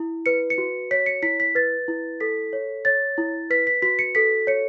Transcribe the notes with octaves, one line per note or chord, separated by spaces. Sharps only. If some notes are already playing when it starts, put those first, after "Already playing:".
Already playing: E4
B4 C#7
C#7
F#4
C#5 B6
C#7
E4 B6
B6
B4 A6
E4
A4 B6
C#5
C#5 A6
E4
B4 B6
B6
F#4 B6
C#7
A4 B6
C#5 C#7